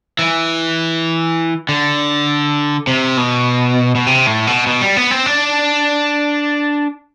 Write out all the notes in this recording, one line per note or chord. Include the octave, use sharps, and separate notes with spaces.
E3
D3
C3
B2
B2
C3
A2
B2
B2
G3
B3
C4
D4